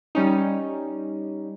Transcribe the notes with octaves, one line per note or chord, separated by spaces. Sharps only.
G3 C#4 D#4